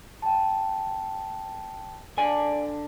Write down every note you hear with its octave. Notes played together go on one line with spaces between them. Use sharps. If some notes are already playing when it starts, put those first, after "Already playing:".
G5 A5
D3 D5 G#5